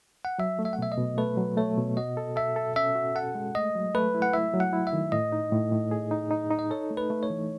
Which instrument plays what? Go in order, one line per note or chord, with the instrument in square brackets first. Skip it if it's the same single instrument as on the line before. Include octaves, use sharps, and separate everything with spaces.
[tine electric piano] F#5
[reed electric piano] F#3 [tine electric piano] E5
[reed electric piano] A3
[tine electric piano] E5
F#5
[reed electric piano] B2 [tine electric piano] E5
[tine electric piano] D#5
[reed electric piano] B2
[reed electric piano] A3 [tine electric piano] B4
[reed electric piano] F#3
[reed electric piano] A3 [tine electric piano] C#5
[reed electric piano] B2
[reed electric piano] F#4 [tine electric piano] D#5
[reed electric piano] A4
[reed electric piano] A4 [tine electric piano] E5
[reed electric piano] A4
[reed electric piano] C#4 [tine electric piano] E5
[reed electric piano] F#4
[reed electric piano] A4 [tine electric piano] F#5
[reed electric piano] G#3
[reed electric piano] A3 [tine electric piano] D#5
[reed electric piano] F#3
[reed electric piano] A3 [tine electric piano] B4
[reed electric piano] E4
[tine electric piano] F#5
[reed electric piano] E4 [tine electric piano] E5
[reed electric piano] F#3
[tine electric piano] F#5
[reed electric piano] E4
[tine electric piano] E5
[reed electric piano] D#3
[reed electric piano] A2 [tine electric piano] D#5
[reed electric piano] D#4
A2
A2
G#4
D#4
D#4
D#4
[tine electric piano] D#5
[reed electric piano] A4 [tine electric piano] C#5
[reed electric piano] A3
[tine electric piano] B4
[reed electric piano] A3
[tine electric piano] C#5
[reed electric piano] E3